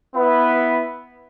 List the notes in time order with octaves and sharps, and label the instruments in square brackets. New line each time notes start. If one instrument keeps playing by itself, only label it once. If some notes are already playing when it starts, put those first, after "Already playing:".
[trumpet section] B3 E4 B4